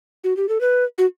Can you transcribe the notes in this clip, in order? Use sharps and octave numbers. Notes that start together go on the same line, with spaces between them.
F#4
G4
A4
B4
F#4